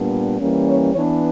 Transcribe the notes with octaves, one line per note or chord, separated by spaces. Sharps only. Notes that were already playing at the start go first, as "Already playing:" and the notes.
Already playing: A#2 G3 B3 D4
E3 G3 A#3 C#4
C#5
E3 B3 D4 C#5